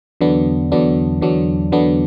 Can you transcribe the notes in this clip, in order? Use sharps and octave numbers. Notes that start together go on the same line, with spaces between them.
E2 D3 F#3 B3 D4
E2 D3 F#3 B3 D4
E2 D3 F#3 B3 D4
E2 D3 F#3 B3 D4